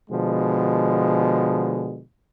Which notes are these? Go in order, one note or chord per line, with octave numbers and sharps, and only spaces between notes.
B2 D3 F3 G#3